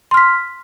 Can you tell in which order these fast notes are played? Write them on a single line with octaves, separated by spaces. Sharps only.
C6 F6 B6